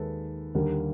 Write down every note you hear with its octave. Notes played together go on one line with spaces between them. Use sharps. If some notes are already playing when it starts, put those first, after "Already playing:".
Already playing: D#2 D#3 G#3 A4 B4
D#2 D3 G3 A#3